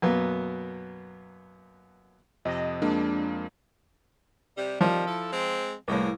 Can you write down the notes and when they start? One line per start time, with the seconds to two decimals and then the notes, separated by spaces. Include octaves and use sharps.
0.02 F#2 B2 A#3 B3
2.45 F2 C3 D#5
2.82 F2 G#3 A#3 D4
4.57 C3 G3
4.81 C3 D#3 F3 G3
5.07 E4 A4
5.32 G#3 C4
5.88 C2 A2 G#3 A#3 B3